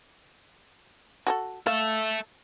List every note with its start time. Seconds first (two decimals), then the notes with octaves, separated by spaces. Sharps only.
1.27 F#4 G#4 A4
1.67 A4 E5 F5